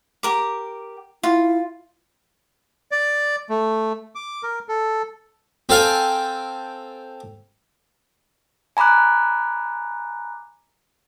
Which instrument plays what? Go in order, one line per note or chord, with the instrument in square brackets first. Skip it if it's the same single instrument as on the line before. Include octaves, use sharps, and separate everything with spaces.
[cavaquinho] G4 A#4 D6
[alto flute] E4 [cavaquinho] F4
[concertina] D5
A3
D6
A#4
A4
[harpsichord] C4 A4 F5 G5 G#5
[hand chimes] G#5 A#5 B5 D6 F#6